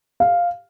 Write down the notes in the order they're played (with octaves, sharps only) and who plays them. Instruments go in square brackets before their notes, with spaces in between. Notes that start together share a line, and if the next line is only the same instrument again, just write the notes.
[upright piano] F5